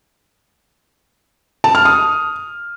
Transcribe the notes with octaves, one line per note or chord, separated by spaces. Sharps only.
A5
F6
D#6